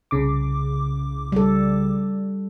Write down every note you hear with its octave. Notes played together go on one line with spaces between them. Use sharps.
C2 C#3 D6
G3 A4